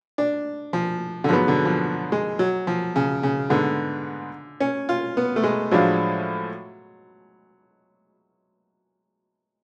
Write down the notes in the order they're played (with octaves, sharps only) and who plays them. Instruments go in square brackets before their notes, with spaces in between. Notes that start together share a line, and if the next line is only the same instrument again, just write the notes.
[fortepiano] D4
F3
D3
[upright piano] G#2 F#3 B3 [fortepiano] F3
[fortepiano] D3
F3
G#3
F#3
F3
C#3
C#3
[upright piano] G#2 G#3 B3 [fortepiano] D3
[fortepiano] C#4
F4
B3
A3
G#3
[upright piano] A2 F3 G#3 D4 F4 [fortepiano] F#3